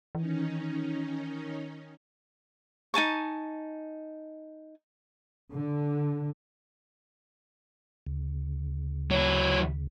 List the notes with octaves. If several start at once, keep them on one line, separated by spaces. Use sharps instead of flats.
D#3 E3 C#4 D#4
D#4 G#5 A5 C#6
D3
D2 C#3
F#3 E4